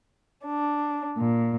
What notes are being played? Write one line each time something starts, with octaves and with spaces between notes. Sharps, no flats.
D4
A#2